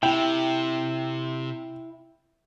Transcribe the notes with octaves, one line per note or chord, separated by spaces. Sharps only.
C3 E4 G5